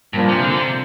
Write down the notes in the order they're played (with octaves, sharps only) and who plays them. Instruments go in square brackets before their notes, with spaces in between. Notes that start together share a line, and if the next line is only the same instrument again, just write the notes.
[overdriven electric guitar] G2 [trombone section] A#2 F3 A#3 D4
[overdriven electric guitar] C3
D3
C3